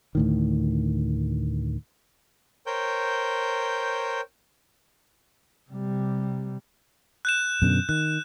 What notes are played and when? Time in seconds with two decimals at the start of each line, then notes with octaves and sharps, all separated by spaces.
0.15 D2 A2 D#3
2.67 A#4 C5 C#5 G5 G6
5.70 C3 G3
7.25 F#6 G6 E7
7.62 F#2 B2 D3
7.89 D#3 F#6